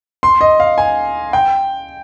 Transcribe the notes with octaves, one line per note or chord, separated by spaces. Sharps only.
C6
D#5
F5
G#5
G5